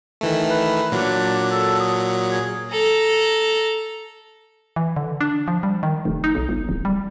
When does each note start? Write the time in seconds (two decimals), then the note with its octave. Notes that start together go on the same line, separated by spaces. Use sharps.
0.21 D#3 E3 A3
0.50 B4
0.92 A#2 F#3 D4
1.51 A4
1.80 D#6
2.32 G#4
2.71 A4 A#5
4.76 E3
4.97 D3
5.21 D4
5.48 F3
5.63 G3
5.83 D#3
6.05 F1
6.24 D#4
6.35 B1
6.49 G1
6.69 D1
6.85 G3